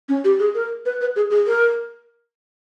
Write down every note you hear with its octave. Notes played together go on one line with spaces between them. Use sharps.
C#4
G4
G#4
A#4
B4
B4
G#4
G#4
A#4